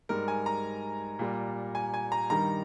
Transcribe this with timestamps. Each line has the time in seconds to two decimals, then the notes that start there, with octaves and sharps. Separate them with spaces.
0.09 G#2 G3 A#4
0.28 G#5
0.46 A#5
1.19 A#2 G3
1.75 G#5
1.94 G#5
2.12 A#5
2.30 G2 D#3 G3 A#5